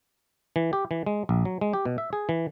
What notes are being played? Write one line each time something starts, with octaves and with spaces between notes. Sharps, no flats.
E3
G4
E3
G#3
A#1
F#3
G#3
G4
B2
E5
G#4
E3